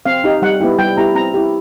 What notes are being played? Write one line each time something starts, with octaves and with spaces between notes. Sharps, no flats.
C4 F5
D#4 G4
G3 F#5
B3 E4 G4
G3 G5
B3 E4 G4 A#5
C4 A#5
E4 G4